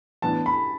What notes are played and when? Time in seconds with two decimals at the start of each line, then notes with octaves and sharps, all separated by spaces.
0.22 A2 E3 B3 D4 A5
0.46 B5